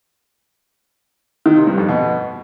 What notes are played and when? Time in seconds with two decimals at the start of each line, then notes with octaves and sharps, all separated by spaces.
1.46 D#3
1.56 C3
1.67 G2
1.78 F2
1.88 B2